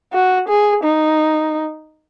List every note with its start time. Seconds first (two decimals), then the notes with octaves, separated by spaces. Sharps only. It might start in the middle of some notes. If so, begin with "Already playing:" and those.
0.13 F#4
0.48 G#4
0.83 D#4